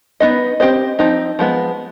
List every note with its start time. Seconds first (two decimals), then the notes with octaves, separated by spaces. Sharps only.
0.20 B3 D#4 B4 D#5
0.60 C4 G4 C5 D#5
0.99 F3 C4 D#4
1.39 F3 G#3 B3